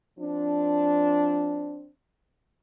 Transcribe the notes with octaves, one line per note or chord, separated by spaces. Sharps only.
F3 C4 D4